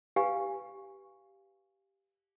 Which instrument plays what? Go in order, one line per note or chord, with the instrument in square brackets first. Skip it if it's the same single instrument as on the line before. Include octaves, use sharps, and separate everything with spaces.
[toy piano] G4 B4 F5 G#5